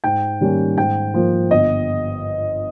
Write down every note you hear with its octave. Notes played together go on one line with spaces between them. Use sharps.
G#2 G5
D#3 G3 A#3 C#4
G#2 G5
F3 A#3
G1 D#5